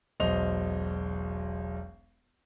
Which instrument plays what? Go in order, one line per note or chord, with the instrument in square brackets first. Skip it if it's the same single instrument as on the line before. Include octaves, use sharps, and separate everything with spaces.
[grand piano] E1 B1 C5 D#5 F7